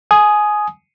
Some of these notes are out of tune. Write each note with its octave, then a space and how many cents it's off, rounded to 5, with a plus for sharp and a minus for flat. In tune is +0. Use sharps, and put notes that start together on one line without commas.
G#5 +15 D#6 +0